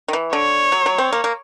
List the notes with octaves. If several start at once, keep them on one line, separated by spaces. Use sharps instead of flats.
D#3
E3
D3 C#5
F#3
F#3
C4
A#3
A#3